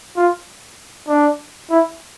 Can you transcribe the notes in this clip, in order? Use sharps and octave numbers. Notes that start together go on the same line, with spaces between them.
F4
D4
E4